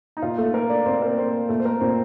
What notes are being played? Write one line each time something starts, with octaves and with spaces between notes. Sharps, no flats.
D#4
A#2 F4
A3 A4
A3 A#3 A#4
D4 D5
A#2 C4 C5
A#3 A#4
A3 C4 C5
A#2 A3 A4
C5
A#3 A#4
A#2 C4 C5